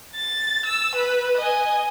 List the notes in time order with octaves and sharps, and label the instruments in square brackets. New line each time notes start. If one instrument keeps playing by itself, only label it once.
[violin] A6
E6
B4
D#5 G#5